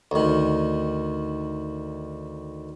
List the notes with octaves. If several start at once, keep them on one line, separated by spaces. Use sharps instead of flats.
D2 D#3